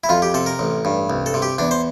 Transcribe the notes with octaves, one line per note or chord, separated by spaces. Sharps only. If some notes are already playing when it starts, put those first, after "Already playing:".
E4
F2 F4
G4
C3 A4
A#4
A1
G2
C2
A4
C3
G4
E2 D4
C5